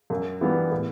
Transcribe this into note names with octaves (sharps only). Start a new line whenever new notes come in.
F#2
E3 G3 B3
A2